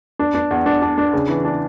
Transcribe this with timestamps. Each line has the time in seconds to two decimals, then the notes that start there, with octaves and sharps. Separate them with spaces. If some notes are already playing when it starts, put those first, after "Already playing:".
0.19 D4
0.35 D4
0.51 E2
0.66 D4
0.82 D4
0.98 D4
1.13 C#3
1.29 E3
1.45 D4